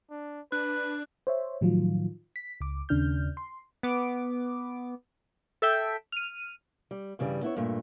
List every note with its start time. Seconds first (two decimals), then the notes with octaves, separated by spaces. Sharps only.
0.10 D4
0.52 D4 B4 F#6
1.27 C5 C#5 E5
1.61 A2 D#3 F3 F#3 F4
2.36 B6
2.61 C#2 D6
2.89 D#2 C#3 D4 F6 G6
3.37 C6
3.83 B3 D6
5.62 A4 E5 G5
6.12 F6 D#7
6.91 G3
7.19 G2 C#3 E3 G3
7.43 B3 E4 C#5
7.57 G2 A#2 A3